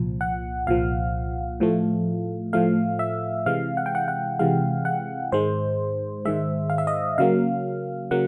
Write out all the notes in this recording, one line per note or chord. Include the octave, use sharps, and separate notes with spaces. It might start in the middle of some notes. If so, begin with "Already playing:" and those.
Already playing: C2 A#2 F3
F#5
C2 A#2 F3 F5
A2 F3 A3
A2 F3 A3 F5
E5
C3 E3 G#3 F5
F#5
G5
F#5
F#5
C3 E3 G#3 F5
F#5
G#2 D#3 G#3 C5
G#2 D#3 G#3 E5
F5
E5
D#5
C#3 F#3 A#3 F5
C#3 F#3 A#3 F#5